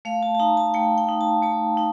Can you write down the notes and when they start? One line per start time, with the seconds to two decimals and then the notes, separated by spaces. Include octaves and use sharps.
0.05 A3 F5
0.23 A5
0.35 A5
0.39 D#4 A#5
0.57 A5
0.74 A3 G5
0.98 G5
1.09 D#4
1.21 A5
1.43 A3 A5
1.77 D#4